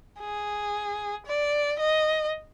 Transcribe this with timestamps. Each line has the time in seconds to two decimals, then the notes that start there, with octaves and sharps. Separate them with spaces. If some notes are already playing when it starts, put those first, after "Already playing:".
0.20 G#4
1.26 D5
1.79 D#5